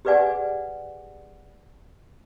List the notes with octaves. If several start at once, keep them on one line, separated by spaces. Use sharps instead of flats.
G4 G#4 B4 D5 F#5 G#5